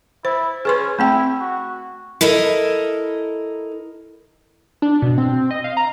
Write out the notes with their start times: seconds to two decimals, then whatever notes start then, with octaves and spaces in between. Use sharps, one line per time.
0.25 E4 C5
0.65 C#4 G#4 B4 C6
0.99 A3 C4 E4 G5
1.41 F#4
2.21 E4 A4 A#4 D#5
4.82 D4
5.02 B2
5.18 C4
5.51 D#5
5.64 F5
5.77 A#5